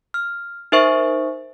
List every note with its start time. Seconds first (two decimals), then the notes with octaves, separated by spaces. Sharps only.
0.14 F6
0.72 D#4 A#4 C5 E5 C#6